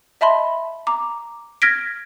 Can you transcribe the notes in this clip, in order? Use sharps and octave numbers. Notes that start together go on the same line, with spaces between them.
D#5 E5 A5 B5 C6
A#5 D6
F6 G#6 A#6 B6 D7